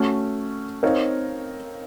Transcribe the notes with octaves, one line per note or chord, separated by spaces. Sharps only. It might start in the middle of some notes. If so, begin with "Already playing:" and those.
Already playing: A3 C#4 F#4
C4 D#4 A#4 C#5 F5